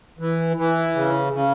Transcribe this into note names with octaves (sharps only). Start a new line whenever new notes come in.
E3
E3
C#3
C#3